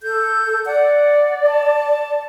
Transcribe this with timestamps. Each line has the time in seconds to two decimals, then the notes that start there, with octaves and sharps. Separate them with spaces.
0.03 A4 G6
0.66 D5 F#5
1.47 A5